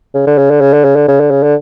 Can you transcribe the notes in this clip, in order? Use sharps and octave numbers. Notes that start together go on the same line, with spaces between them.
C#3
D3
C#3
D3
C#3
D3
C#3
D3
C#3
D3
C#3
D3